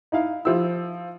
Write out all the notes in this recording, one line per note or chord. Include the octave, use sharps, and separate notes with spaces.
D#4 E4 F5
F3 E4 F4 G4 E6